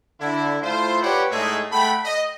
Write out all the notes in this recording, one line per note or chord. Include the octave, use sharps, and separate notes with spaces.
D3 E4
A3 E4 F4 C5
G4 B4 C#5 D5 F#5 G5
A2 G#3 A3 D#4 G#4 E5
A3 F#5 G5 B5
D#5